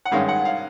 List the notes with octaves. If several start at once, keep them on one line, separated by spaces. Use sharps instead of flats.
F#5
G2 D#3 G#3 C#4 F5
F#5
F5